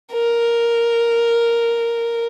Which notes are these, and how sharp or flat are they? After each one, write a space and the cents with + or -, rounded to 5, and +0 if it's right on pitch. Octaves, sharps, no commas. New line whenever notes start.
A#4 +0